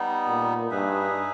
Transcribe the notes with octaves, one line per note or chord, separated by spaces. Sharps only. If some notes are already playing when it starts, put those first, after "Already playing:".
Already playing: G3 B3 D#4
A#2
G2 D#4 G#4 B4 E5